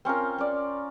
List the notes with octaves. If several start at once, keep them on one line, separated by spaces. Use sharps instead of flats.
C4 C#4 F4 A#4
C#4 D5